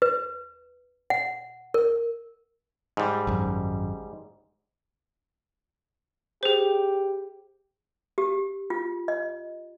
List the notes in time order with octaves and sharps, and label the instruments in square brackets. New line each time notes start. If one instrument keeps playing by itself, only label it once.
[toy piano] B4
F#5
A#4
[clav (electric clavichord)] G#2 G3
[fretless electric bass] G#1 F#2
[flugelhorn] G4 [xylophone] G#4 C5
[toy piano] G4
F4
D#5